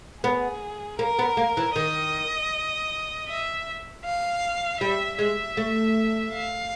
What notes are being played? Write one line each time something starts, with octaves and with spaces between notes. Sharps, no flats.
B3 G#4
A#3 A#4
B3
A#3
E3
D#3 D#5
E5
F5
G3 E5
G#3 E5
A3
F5